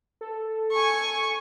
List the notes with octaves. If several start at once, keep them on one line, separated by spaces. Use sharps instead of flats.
A4
G#5 C#6